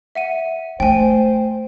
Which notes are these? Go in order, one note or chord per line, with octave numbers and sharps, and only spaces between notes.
E5 F#5 D#7
A3 C5 G5 G#5